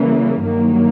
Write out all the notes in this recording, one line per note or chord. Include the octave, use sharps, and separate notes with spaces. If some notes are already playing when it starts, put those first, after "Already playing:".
Already playing: C#3 E3 G3 A#3
G2 D#3 F#3 A#3